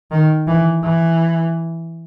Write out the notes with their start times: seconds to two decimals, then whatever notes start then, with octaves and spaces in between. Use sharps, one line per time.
0.11 D#3
0.47 E3
0.83 E3